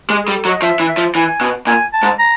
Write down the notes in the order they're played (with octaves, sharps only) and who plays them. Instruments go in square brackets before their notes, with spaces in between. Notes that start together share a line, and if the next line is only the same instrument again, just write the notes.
[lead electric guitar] G#3 [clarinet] G4
[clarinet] G#4
[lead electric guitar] G3
[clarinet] A4
[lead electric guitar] F#3
[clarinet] D#5
[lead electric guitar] F3 [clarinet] E5
[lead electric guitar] E3
[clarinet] E5
[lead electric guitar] F3
[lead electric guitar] E3 [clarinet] G#5
[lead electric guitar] B2
[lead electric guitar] A#2 [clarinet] G#5
[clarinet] A5
[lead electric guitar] G#2
[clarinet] A#5